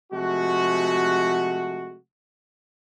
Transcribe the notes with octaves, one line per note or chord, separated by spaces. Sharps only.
C3 F3 G#3 A3 F#4